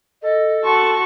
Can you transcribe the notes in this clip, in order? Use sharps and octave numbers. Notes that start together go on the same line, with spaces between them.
A4 D#5
F#4 A5 C6 C#6